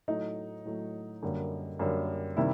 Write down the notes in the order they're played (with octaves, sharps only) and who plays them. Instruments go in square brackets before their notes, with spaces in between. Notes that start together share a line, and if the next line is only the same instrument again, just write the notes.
[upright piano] A2 F#3 A3 D#4
A2 F#3 A3
F#2 D3 G3 A#3
F#2 D3 G3 A#3
C3 D#3 G3 E4